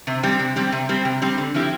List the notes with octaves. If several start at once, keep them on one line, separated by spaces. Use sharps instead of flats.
C3
G3 C4 G4
C3
G3 C4 G4
C3
G3 C4 G4
C3
G3 C4 G4
D3
F3 C4 E4 G4